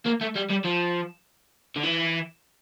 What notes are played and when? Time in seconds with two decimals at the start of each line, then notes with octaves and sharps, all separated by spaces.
0.06 A#3
0.21 A3
0.35 G3
0.50 G3
0.64 F3
1.76 D3
1.83 E3